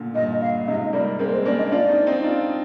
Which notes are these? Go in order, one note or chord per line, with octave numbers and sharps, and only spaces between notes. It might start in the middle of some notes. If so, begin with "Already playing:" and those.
Already playing: A#2 D3
G2 A#2 D#5
F5
G#2 C3 D#5
G3 A#3 D5
G#3 C4 A#4
C5
A#3 D4 D5
D#5
D4 F4 D5
C4 D#4
C4 D#4
D4 F4